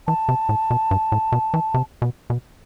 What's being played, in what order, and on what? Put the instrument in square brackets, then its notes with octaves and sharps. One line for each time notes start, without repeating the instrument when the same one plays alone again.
[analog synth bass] E3 [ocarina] A5
[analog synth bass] C3
A2
B2
G2
A2
B2
E3
C3
B2
B2